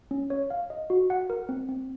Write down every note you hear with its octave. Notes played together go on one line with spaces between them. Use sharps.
C#4
C#5
F5
D#5
F#4
F#5
A#4
C4
C4